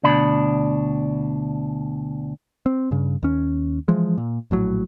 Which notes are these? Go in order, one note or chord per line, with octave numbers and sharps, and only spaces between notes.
D2 B2 D4 B5
C4
G2 C#3
D#2 C#4
E3 F3 G#3
A#2
A#1 A2 F#3